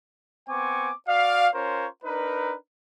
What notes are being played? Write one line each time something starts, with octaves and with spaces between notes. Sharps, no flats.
B3 C4 G#5 C#6 D6
F#4 D5 F5
C#4 F4 A#4 C5 C#5
D4 D#4 A#4 B4